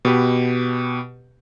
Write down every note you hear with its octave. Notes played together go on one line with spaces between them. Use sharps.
B2 G4 B4